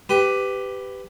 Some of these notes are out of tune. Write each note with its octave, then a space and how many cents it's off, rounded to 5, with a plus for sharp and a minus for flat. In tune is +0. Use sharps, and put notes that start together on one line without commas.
G4 +0 B4 +20